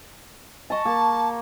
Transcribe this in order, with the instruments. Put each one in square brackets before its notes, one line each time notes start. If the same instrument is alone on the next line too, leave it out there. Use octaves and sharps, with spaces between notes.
[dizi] D#5 [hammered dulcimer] A5 C#6
[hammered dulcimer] A#3 [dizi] A5